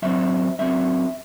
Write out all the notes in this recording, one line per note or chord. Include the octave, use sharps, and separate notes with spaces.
F#2 F#3 C4 E5
F#2 F#3 C4 E5